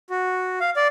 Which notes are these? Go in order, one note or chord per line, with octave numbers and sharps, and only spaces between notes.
F#4
F5
D5